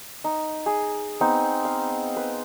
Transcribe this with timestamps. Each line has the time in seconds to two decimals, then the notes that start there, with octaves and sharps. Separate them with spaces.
0.24 D#4
0.66 G#4
1.21 B3 C4 D#4
1.65 F5
2.17 B4